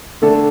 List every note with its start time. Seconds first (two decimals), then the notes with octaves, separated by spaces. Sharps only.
0.22 D3 A3 D4 A4